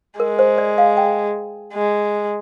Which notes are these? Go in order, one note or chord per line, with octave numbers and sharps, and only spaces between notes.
G#3 A#4
C5
D5
F5
G5
G#3